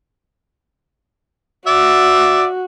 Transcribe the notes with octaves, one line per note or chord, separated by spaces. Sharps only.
F#4 D5 E5